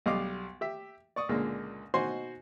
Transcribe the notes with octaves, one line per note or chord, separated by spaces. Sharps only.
B1 G3 D#5 F5 D6
G4 E5
D5 C#6 D#6
C#2 A#2 D3 G#3 A#3
B2 D#4 F#4 C5 G#5 C6